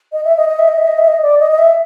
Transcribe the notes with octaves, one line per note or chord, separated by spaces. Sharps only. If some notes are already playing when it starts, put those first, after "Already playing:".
D#5
E5
D#5
D#5
E5
D#5
E5
D#5
E5
D#5
D5
D#5
D#5
E5